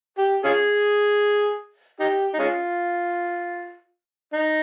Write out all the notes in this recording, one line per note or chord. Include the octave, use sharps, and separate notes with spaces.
G4
C#4 F4 G#4
D#4 G4
D#4
G#3 C#4 F4
D#4